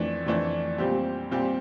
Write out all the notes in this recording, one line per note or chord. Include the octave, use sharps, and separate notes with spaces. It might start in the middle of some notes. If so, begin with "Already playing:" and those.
Already playing: F2 E3 A3 D4
F2 E3 A3 D4
A#2 G3 C4 G4
A#2 G3 C4 G4